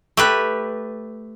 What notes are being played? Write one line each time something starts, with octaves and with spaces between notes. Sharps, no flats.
A3 G4 B4